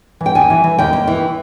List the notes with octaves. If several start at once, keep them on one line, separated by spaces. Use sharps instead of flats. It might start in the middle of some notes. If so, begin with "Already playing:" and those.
E3
G5
D#2 G#5
E3
E3
D#2 G5
D#2
E3